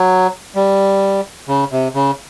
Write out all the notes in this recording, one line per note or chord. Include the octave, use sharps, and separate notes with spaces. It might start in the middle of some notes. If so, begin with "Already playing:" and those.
Already playing: F#3
G3
C#3
C3
C#3